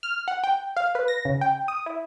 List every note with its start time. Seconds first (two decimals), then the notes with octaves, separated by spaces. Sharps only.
0.03 F6
0.28 F#5
0.44 G5
0.77 F5
0.95 B4
1.08 A#6
1.25 C#3
1.41 G5
1.68 D#6
1.86 E4